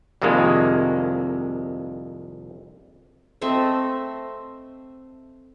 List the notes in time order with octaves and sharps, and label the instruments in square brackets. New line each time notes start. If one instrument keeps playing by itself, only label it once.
[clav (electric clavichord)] C2 F2 C3 D#3 G#3 A#3
[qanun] A3 C4 D#5 E5